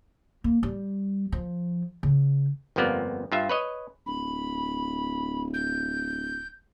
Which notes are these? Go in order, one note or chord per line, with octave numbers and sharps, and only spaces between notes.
A#3
G3
F3
C#3
G1 F2 F3 A#3 B3 D5
G2 F4 E5
B4 C#5 D#5
D1 B5
G6